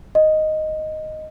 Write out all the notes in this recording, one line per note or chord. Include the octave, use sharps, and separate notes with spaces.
D#5